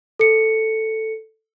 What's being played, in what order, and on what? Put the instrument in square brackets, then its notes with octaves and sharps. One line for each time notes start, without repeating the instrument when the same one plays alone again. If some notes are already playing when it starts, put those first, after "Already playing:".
[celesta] A4 C#7